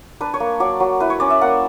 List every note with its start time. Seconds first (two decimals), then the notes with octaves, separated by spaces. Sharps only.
0.21 D4 B4
0.34 C#5
0.40 A#3
0.60 F#3 D5
0.80 F#3
1.00 E4 B4
1.10 C#5
1.20 C#4 D5
1.30 E5
1.41 A#3 F#5